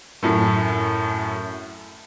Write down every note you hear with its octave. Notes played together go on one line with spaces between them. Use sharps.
F#2 A2 A3